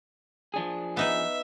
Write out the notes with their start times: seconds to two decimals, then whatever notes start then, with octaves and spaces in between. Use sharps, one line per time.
0.54 F3 D4 G#4
0.97 B3 D#4 B4 E5